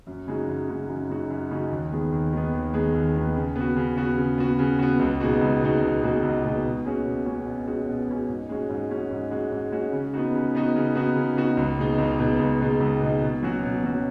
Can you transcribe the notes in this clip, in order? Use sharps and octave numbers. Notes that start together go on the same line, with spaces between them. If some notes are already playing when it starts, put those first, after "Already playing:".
F#2
C#3 G#3 D#4 F#4
F#2
C#3 G#3 D#4 F#4
F#2
C#3 G#3 D#4 F#4
F#2
C#3 G#3 D#4 F#4
D#2
D#3 G#3 B3
D#2
D#3 G#3 B3
D#2
D#3 G#3 B3
D#2
D#3 G#3 B3
C#3
B3 F#4
C#3
B3 F#4
C#3
B3 F#4
C#3
B3 F#4
C#2
B2 G#3 D#4 F#4
C#2
B2 G#3 D#4 F#4
C#2
B2 G#3 D#4 F#4
C#2
B2 G#3 D#4 F#4
B2
G#3 C#4 F#4
B2
G#3 C#4 F#4
B2
G#3 C#4 F#4
B2
G#3 C#4 F#4
G#2
G#3 C#4 F#4
G#2
G#3 C#4 F#4
G#2
G#3 C#4 F#4
G#2
G#3 C#4 F#4
C#3
B3 D#4 F#4
C#3
B3 D#4 F#4
C#3
B3 D#4 F#4
C#3
B3 D#4 F#4
C#2
B2 G#3 D#4
C#2
B2 G#3 D#4
C#2
B2 G#3 D#4
C#2
B2 G#3 D#4
B2
F#3 C#4 F#4
B2
F#3 C#4 F#4